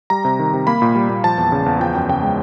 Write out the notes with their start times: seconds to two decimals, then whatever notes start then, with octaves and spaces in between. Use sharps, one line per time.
0.10 G3 A#5
0.25 C3
0.39 D#3
0.53 C3
0.67 A#3 B5
0.82 A#2
0.96 G3
1.09 A#2
1.24 F3 A5
1.38 E2
1.52 C#3
1.66 E2
1.80 F3 G5
1.95 F#2
2.09 C#3 G5
2.23 G#3